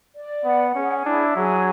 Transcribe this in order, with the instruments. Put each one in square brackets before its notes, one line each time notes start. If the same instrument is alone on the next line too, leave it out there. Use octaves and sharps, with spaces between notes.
[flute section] D5
[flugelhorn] B3 [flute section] F#5
[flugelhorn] C#4 [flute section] G#4
[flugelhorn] D4 [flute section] E4
[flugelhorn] F#3 [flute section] G#4